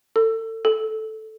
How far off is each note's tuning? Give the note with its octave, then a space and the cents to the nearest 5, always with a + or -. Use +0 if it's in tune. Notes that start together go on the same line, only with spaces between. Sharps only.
A4 +30
A4 -5